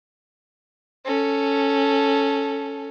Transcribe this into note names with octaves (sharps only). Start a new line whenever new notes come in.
C#4 A4